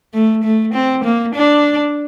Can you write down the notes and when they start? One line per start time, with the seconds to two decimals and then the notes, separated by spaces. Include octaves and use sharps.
0.14 A3
0.44 A3
0.74 C4
1.04 A#3
1.35 D4